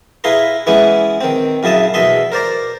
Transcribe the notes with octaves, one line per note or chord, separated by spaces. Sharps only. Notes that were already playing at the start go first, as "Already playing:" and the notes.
E4 G#4 B4 F5 A#5 C6
E3 G#3 B3 C#4 E4
D#3 C4
F#2 C#3 E4 D#5 A5
E2 B2 D#5 E5 C6
A#4 C5 D5 A#5